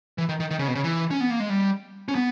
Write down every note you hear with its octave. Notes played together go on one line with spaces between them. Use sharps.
E3
D#3
D#3
D#3
C#3
B2
C#3
E3
C#4
B3
A#3
G#3
G3
C#4
B3